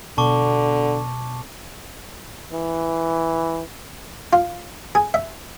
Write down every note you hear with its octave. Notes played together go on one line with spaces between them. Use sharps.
B2 D3 A5 C#6 D6
E3
F4
G#4
E5